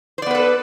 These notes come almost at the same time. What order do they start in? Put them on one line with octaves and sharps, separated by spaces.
C5 D5 B3 B4 A4